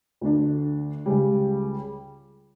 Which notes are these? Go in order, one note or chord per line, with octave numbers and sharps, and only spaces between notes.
D2 D3 A3 D4
C#2 C#3 G3